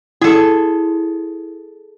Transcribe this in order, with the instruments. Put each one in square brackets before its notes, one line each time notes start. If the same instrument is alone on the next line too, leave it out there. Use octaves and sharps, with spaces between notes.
[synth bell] E4 [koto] G#4 A4